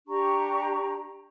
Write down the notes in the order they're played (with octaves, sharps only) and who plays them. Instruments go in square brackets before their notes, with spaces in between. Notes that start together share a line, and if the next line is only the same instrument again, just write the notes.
[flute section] D4 G4 A#5 C#6